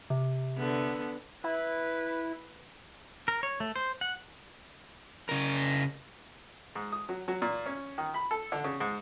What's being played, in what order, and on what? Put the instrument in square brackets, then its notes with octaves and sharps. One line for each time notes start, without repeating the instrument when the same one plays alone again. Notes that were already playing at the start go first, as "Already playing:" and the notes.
[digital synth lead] C3
[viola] D3 B3
[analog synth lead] E4 [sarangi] B4
[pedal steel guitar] A#4
C#5
A3
C5
F#5
[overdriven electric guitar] C#3 A#4
[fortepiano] G#2
D#6
F#3
F#3
A#2
C#4
D#3
B5
A4
D3
C#3
G#2